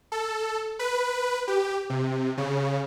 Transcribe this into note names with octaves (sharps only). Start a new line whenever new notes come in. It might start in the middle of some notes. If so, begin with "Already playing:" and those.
A4
B4
G4
C3
C#3